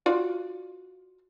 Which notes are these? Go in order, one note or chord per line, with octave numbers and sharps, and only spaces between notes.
F4 F#4 D5